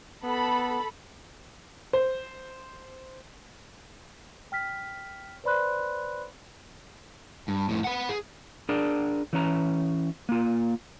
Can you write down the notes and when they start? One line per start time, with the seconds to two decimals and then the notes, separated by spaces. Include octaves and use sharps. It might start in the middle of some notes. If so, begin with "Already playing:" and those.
0.24 B3 A4 B5
1.93 C5
4.52 G5 F6 B6
5.44 B4 C5 D5 B5 C6 F#6
7.48 G2
7.69 F2 A2
7.84 B4 F#5
8.09 G#4
8.69 D4 G#4 A#4 D5
9.33 E3 C#4 A#5
10.29 A#3 F4